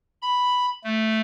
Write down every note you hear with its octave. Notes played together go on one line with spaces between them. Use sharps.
B5
A3